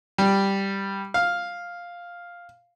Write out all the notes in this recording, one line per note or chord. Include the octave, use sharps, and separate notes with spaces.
G3
F5